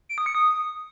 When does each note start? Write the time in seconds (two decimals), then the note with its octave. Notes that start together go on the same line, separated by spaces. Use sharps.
0.09 D7
0.18 D#6
0.26 C#7
0.35 D#6